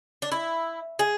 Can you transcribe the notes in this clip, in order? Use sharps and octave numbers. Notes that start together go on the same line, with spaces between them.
D4
E4
G#4